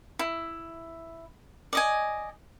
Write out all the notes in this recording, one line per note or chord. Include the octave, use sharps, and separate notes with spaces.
E4
D5 D#5 G#5